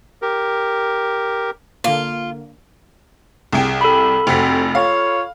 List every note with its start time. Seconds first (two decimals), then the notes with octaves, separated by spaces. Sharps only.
0.22 G4 A#4
1.84 D3 A#3 F4
3.53 C2 G#4 G5
3.81 A4 B5
4.27 F1 F2 C4 F#4 B6
4.75 F4 C#5 F5